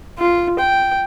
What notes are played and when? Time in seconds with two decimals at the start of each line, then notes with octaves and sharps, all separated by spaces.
0.18 F4
0.59 G5